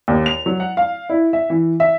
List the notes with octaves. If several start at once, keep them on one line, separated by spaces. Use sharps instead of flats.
D#2
F7
F#3
F#5
F5
E4
E5
E3
E5